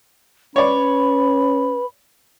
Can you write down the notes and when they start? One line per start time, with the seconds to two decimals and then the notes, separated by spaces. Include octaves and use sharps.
0.56 C#4 B4 C#5 D5 B5